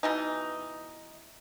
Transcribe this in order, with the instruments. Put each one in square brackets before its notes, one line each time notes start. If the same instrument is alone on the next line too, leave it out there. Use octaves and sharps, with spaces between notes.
[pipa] B2 E3 D#4